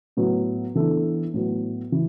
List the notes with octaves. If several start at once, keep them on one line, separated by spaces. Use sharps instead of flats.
A2 F#3 B3
E3 B3 D4 A4
A2 F#3 B3
E3